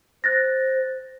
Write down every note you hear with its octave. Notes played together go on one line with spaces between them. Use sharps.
C5 F#6 A6 A#6